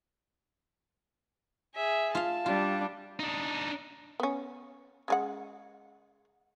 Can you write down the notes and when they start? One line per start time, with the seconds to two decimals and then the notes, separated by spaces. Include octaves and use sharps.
1.76 G#4 E5
2.15 F4 F5 A5
2.46 G3 D4 F4
3.20 D4 D#4
4.20 B3 C#4
5.08 C#3 G#3 F#5